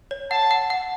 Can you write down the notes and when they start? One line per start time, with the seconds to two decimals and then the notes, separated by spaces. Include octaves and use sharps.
0.11 C#5
0.31 F#5 A5
0.51 F#5
0.70 F#5